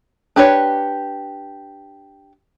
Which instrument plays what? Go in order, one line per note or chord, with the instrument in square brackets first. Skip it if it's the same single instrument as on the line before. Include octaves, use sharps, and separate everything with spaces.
[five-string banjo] D4 G4 B4 C#5